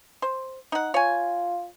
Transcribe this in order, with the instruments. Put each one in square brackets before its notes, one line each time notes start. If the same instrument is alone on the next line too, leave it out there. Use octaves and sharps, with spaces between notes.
[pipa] C5
D#4 F#5
[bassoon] F4 [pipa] C#5 G#5